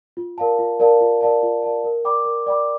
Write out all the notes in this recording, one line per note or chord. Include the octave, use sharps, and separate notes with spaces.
F4
A#4 D5 F5 A5
F4
A#4 D5 F5 A5
F4
A#4 D5 F5 A5
F4
A#4 D5 F5 A5
A#4
D5 G5 B5 D6
A#4
D5 G5 B5 D6